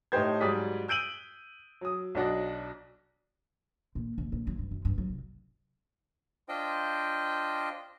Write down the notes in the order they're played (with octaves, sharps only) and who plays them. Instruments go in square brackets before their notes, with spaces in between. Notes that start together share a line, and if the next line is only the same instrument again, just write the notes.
[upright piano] A2 A3 D#4 G4 C5 G#6
G#2 F#3 G3 D5 D#6 B6
E6 G6 D7 D#7 F#7
F#3 D#6
B1 F#3 D4 F#4 D5 D#5
[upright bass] A#2
D#1
A#2
F#3
G2
F#2
G2
F#3
C3
[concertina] D4 F4 C5 D#5 G5